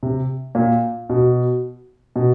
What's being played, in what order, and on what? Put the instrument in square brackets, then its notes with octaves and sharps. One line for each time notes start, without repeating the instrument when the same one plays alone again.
[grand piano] C3
A#2
B2
B2